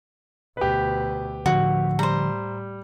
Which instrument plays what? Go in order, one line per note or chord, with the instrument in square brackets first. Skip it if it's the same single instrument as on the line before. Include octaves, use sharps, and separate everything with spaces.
[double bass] D2 B2 [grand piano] G4 B4
[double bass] A2 [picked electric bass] D3 F3 [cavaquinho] F#4
[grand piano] G3 [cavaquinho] C5 A#5